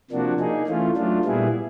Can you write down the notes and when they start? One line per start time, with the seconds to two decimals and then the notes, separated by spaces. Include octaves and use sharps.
0.11 C3 F3 A#3 D4 F#4
0.40 A#3 D#4 G#4
0.67 E3 A3 C#4 F4
0.97 F#3 A3 D4 F4
1.25 A#2 G3 B3 E4 G#4